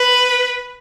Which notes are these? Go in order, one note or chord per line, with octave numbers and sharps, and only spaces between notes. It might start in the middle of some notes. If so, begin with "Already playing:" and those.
Already playing: B4